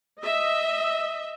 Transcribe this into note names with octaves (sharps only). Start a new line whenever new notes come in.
D#5 E5